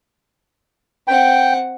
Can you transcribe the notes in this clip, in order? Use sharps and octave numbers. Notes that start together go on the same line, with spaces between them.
C4 F#5 G5